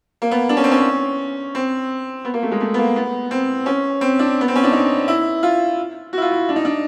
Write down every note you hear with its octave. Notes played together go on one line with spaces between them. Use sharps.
A#3
B3
D4
C#4
C4
C#4
C4
B3
A#3
A3
G#3
A3
B3
A#3
B3
C4
C#4
C4
D4
B3
C4
C#4
D4
D#4
E4
F4
F#4
E4
F4
E4
D4
D#4
D4